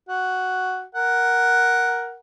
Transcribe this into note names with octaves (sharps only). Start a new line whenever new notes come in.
F#4
A#4 F#5